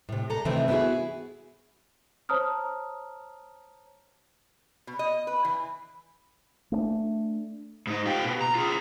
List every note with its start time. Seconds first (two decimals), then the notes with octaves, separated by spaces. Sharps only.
0.09 A2 C3
0.30 A#2 A4 A#5
0.45 C3 D#3 E3 A3 C4 E4
0.68 B3 D#4 E4 F#4 G#4
2.29 C5 C#5 A5 A#5 D#6 F6
4.87 B2
4.99 D#5
5.27 B4
5.45 E3
6.72 A3 C4 D4
7.87 G#2 D#4
8.06 F4 G4
8.24 B2
8.41 A#5
8.55 F4 G#4